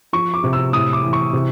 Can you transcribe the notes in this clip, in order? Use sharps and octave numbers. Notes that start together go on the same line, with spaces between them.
F3 C#6
D6
C3
E6
A2 D#6
D6
E3
C#6
C3